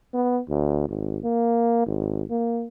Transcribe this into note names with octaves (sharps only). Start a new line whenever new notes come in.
B3
D2
G#1
A#3
G#1
A#3